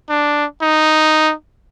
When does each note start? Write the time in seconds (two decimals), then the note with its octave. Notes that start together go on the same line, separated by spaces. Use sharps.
0.09 D4
0.62 D#4